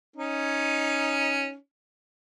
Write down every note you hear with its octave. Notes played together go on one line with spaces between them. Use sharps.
C#4 D#4